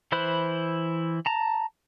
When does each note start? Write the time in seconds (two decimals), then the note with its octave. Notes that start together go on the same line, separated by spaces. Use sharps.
0.12 E3 E4 C5 B5 F#6
1.26 A5 A#5